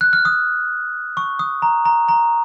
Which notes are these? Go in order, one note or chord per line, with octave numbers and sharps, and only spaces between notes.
F#6
F6
D#6
C#6
D#6
A#5
A#5
A#5